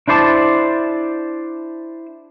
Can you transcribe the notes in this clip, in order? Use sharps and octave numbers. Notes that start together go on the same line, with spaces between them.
D4 E4 C5 D5 A5